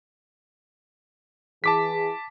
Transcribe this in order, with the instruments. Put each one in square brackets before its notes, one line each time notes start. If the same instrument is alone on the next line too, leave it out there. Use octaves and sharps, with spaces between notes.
[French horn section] E3 G#4 [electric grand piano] A5 D6 B6